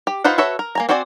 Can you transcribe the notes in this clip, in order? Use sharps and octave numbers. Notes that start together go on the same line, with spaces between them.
G4
D#4 F4 B4 C5 F#5
F#4 A4 B4 C#5 E5
A#4
A#3 G#5 A#5
C4 F#4 C5 D5 G#5